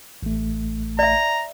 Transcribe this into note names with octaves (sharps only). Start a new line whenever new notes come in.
A1 A3
D5 E5 A#5